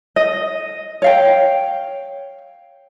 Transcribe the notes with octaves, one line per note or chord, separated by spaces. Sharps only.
D#5
C#5 F5 G5